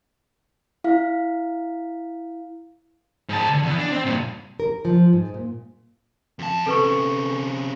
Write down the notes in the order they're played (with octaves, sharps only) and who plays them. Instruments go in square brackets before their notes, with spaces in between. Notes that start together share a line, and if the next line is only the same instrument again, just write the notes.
[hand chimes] E4 F5
[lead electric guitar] G#2 A5
D3
E2 E3
D4
C4
G2 A#2
[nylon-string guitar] A#4
F3
G#2
A#2
[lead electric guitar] F2 A5
[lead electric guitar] C3 C#4 [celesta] A4 B4 C#6